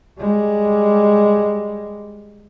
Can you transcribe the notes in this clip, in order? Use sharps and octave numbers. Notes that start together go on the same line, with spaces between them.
G3 G#3